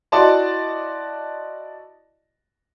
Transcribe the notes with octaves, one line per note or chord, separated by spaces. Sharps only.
E4 F#4 D5 D#5 A5 C6